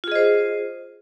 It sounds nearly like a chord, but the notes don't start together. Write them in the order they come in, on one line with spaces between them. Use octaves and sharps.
F4 G#4 D#5 C5